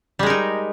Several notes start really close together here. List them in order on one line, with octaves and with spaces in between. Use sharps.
G3 G#3 A#4 D#4